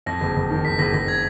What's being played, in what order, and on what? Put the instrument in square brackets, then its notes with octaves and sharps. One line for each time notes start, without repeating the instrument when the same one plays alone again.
[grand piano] F2 [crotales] A#6
[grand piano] F#1
F#1
D#3
[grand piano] F#1 [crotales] B6
[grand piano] F#1 [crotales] A#6
[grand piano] F#1 [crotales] A#6
[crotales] G#6